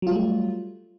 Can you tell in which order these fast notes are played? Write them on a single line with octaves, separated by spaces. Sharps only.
F#3 F4 G3 A3